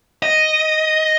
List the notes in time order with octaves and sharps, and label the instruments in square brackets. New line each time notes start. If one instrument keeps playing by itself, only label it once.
[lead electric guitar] D#5